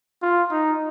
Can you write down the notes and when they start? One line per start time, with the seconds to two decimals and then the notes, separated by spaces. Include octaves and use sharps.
0.22 F4
0.51 D#4